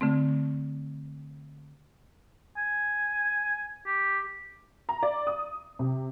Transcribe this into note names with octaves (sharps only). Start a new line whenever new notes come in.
D3 A3 C4
G#5
G4
A#5
D5
D#6
C3